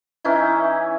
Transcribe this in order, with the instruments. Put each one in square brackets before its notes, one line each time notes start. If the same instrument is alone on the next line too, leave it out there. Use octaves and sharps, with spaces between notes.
[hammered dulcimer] E3 C#4 D#4 E4